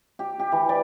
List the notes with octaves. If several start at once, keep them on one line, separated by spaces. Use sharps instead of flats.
G4
G4
E3
D5